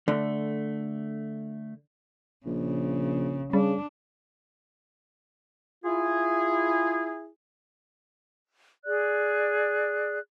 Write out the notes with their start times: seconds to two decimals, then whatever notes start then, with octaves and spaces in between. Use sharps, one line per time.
0.08 D3 A3
2.46 A#1 C#3
3.53 C#3 G3 D4
5.84 E4 F4 G#4
8.85 G#4 D5 F#6